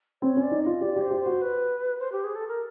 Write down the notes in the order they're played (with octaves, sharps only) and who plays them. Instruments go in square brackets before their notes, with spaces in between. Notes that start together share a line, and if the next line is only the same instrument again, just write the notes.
[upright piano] C4 [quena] C#5
[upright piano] C#4 [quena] D5
[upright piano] D#4
[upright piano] F4 [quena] D#5
[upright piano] G4 [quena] D5
[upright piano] G4 [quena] C5
[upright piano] G4
[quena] C5
[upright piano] F#4
[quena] B4
C5
G4
G#4
A4
A#4